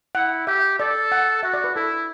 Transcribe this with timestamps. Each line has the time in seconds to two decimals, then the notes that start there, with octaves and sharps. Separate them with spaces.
0.15 E4 F#5
0.47 G4 E5
0.79 A4 D5
1.12 F#5
1.43 F#4 E5
1.54 D5
1.64 B4
1.76 E4 A4